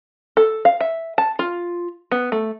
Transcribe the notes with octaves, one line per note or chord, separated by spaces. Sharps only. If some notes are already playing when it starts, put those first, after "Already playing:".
A4
F5
E5
A5
F4
B3
A3